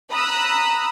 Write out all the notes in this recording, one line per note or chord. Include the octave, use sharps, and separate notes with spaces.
A#5 B5 D#6 E6 F#6